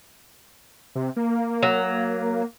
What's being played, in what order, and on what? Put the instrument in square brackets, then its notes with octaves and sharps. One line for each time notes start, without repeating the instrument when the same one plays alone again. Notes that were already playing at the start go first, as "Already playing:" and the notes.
[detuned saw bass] C3
A#3
[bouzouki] F#3